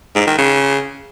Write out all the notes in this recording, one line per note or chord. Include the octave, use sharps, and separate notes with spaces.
G#2
D#3
C#3